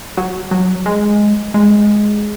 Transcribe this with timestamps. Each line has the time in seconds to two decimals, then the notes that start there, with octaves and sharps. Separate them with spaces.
0.17 F#3
0.51 F#3
0.86 G#3
1.54 G#3